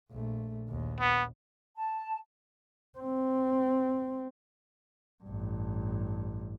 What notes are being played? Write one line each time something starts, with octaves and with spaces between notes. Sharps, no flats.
A#1 A3
A#1 D#2
B3
A5
C4
A1 G2